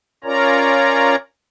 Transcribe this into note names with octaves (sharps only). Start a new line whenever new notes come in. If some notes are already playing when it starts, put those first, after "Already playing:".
C#4 F4 A#4 C#5 D5 A#5